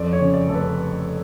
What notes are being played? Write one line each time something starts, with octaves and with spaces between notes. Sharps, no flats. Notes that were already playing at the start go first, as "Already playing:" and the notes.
Already playing: F2 D5
C#5
C#3
D5
F1 A4
B4